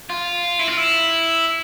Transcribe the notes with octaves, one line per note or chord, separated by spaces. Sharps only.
F4
E4
F4
E4